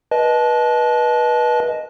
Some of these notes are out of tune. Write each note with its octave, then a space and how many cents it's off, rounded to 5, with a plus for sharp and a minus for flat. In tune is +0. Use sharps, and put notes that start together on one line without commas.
B4 -25 D#5 +0 A5 -25